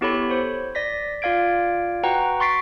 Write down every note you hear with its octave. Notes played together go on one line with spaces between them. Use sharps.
B3 E4 G4 A4 C#5 B5
C5 C#5
D5 A#6 B6
F4 D5 F5 G#6 D7
F#4 B4 F#5 G5 A#5
C6 C#6 A6 B6 C7 D7